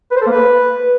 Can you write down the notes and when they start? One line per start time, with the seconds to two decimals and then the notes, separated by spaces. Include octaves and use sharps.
0.11 B4
0.16 C5
0.21 A4
0.27 A#3
0.32 B4